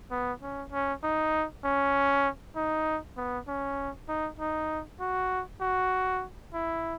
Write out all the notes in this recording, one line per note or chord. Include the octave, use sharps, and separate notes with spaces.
B3
C#4
C#4
D#4
C#4
D#4
B3
C#4
D#4
D#4
F#4
F#4
E4